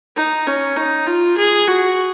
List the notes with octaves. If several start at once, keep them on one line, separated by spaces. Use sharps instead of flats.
D#4
C#4
D#4
F4
G#4
F#4